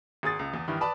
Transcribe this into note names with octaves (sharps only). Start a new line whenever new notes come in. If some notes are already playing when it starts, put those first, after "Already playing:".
G#1 G#4 D#6 A6
C#2
E2
G2 D#3 E3
B4 D5 A5 B5